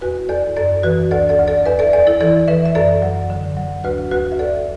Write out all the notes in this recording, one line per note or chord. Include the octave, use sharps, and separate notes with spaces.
E2 F#4 B4
E2 A4 D5
F#2 A4 D5
E3 F#4 B4
D2 A4 D5
A4 D5
D2
A4 D5
E2 B4 E5
A4 D5
E2 A4 D5
E4 A4
E3 A4 D5
E3 B4 E5
E5
F#2 A4 D5
F#3
D3
F#3
D2 F#4 B4
D2 F#4 B4
E5
D2 A4 D5